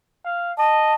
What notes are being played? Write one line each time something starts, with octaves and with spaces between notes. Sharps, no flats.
F5
D#5 A5